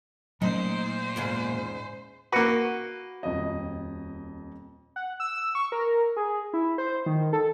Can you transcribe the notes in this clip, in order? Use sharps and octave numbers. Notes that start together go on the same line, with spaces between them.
A#2 F#3 A3 C#4 D#4 C5
E2 G#2 C#3
A#3 F#4 B4
D#1 F2 D#5
F#5
E6
C#6
A#4
G#4
E4
C5
D#3
A4